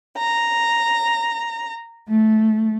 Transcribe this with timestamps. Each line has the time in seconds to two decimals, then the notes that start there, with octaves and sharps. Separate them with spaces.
0.17 A#5
2.08 A3